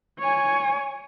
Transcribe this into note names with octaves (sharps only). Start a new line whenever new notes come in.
C#5 G#5